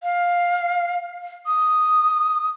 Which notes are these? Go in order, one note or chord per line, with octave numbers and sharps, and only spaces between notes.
F5
D#6